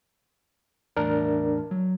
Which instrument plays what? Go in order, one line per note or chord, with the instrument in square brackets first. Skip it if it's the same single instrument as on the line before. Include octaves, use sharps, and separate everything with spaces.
[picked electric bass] E2 A2 [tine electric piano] D4 A#4
[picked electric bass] F#3